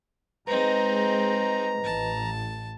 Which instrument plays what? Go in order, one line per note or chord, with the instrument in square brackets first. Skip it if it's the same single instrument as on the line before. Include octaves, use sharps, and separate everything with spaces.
[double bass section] G#3 [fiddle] C4 D#4 [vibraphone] B4 D#5 [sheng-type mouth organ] A#5
[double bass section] A1 [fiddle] A5